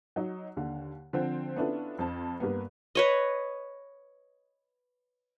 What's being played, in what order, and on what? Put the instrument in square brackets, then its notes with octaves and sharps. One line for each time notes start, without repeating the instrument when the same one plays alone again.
[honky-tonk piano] F#3 D#4
D#2 D3
D3 F3 C4
B3 C#4 D4 E4 F4 A4
F2 C4 A5
G2 A#3 B3
[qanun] B4 C#5 D#5